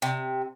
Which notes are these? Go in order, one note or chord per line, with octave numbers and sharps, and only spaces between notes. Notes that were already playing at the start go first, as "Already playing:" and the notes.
C3